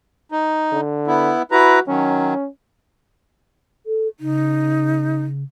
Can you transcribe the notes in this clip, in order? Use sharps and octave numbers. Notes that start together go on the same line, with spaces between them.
D#4
D3
B3 E4
E4 F#4 B4 A#5
D#3 F#3 C#4
A4
C#3 D#4